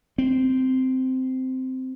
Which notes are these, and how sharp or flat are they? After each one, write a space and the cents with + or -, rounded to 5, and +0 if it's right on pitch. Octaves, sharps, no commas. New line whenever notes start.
C4 -10